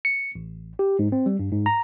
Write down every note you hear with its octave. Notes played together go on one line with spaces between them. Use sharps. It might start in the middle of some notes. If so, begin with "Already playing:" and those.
C#7
A1
G4
G#2
C4
G3
G2
G#2
A#5